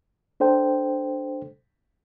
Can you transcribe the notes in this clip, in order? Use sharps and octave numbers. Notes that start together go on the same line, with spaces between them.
D4 A4 C5 G5